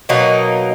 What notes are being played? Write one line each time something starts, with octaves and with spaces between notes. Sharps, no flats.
B2 F#3 A#3 D#4